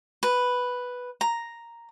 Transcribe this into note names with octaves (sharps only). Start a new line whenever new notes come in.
B4
A#5